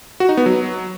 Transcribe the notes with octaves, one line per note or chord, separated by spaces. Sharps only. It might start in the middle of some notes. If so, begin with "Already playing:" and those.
F#4
D#4
B3
F#3